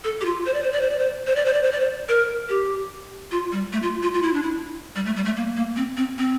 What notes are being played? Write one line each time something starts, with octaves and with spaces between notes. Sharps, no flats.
A4
G4
F4
C5
D5
C5
D5
C5
D5
C5
C5
D5
C5
D5
C5
D5
C5
A#4
G4
F4
G3
A3
F4
F4
F4
E4
D4
E4
G3
A3
G3
A3
A#3
A#3
C4
C4
C4